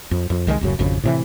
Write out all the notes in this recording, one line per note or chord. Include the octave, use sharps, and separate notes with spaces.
F2
F2
C2 D#3 E3 G#3
D1 F#2 C#3
G#1 F2 C#3
A2 C3 E3